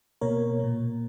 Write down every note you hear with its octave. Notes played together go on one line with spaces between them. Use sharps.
B2 A#3 A#4 C#5
A#2 A#3